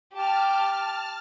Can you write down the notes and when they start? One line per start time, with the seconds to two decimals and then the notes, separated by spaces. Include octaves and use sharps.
0.13 G4 A5 F6